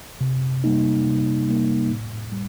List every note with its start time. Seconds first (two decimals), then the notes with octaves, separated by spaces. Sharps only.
0.21 C3
0.64 G3 A#3 D#4
1.06 C3
1.48 G3 A#3 D#4
1.91 A2
2.33 G3